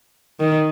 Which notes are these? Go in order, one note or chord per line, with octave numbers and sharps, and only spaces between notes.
D#3